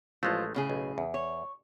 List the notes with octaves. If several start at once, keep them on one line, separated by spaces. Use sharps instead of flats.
A1 F3 G#3 A3 F4
A2 C#3 G#4
B1
E2
C#5